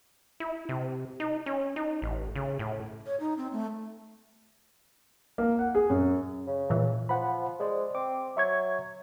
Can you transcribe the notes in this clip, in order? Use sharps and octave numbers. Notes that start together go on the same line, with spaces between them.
E4
C3
D#4
C#4
D#4
A1
C#3
A2
C#5
D#4
C4
A3
A#3
F#5
G#4
F#2
C#3
A#2 E3
F3 C5 F#5 B5
G#3 C5 D5
C4 D6
F#3 E5 C#6 G#6